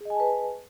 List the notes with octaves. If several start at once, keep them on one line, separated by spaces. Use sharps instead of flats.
G#4 B4 D#5 G#5 A5